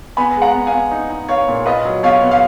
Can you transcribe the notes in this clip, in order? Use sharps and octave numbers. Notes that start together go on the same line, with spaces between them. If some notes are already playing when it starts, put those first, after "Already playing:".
B3 G#5 B5
G#3
F#5 A#5
B3
F5 G#5
B3
D#4
D#4
B3 C#5 F5
A#2
F4 B4 D#5
F#3
B2 C#5 F5
B3
F5